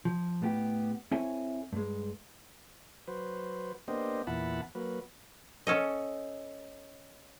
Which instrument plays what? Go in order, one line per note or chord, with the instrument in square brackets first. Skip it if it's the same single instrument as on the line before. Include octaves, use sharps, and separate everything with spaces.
[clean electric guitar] F3
A2 B3 G4
C4 E4 A4 C#5 E5 G#5
G2 G#3
[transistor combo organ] F#3 B4 C5
A#3 B3 D4 G4 C5 D#5
E2 A#2 E4 F#5 A5 B5
F#3 A#3 B4
[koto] C#4 A4 D#5